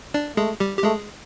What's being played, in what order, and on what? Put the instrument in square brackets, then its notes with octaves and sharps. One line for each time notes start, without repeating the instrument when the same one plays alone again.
[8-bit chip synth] D4 D5
[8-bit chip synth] G#3 G#4 [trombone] A3
[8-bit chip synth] G3 G4
G4
[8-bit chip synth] G#3 G#4 [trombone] A3